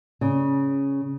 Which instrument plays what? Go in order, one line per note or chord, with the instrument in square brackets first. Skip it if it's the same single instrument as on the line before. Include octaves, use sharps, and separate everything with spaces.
[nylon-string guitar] C#3